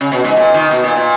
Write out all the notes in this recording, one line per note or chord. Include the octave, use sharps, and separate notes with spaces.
C#3
B2
G#2
A#2
D#3
B2
A#2
A#2